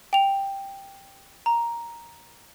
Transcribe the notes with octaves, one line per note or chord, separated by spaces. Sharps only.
G5 F7
A#5